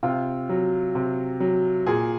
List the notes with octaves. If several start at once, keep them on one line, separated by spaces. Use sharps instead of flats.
C3 F4
F#3
C3
F#3
A#2 G#4